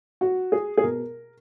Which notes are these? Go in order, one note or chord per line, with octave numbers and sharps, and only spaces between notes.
F#4
G#4
G#4
B2 A#4